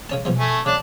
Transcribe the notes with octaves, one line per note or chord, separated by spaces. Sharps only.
C#3 C#4 A5
B2 F3 G#3
A3 G#5
C#3 D4